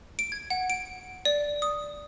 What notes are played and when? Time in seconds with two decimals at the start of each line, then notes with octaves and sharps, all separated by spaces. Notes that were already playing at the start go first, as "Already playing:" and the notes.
0.19 D7
0.32 G#6
0.50 F#5
0.70 D7
1.25 D5
1.62 D#6